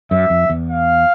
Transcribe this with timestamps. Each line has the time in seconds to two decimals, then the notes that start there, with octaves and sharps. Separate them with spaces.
0.11 F#2 E5
0.30 F2
0.50 E2
0.69 F5